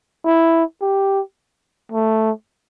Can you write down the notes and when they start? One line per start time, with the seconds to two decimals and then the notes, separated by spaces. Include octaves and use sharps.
0.25 E4
0.81 G4
1.92 A3